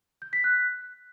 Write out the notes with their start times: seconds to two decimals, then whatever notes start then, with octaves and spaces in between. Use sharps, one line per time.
0.22 G6
0.33 B6
0.44 F#6